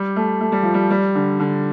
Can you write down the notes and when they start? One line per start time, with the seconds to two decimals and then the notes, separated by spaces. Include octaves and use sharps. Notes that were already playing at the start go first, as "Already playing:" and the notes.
Already playing: G3
0.16 A3
0.41 A3
0.52 G3
0.63 F3
0.74 G3
0.91 G3
1.15 D3
1.40 D3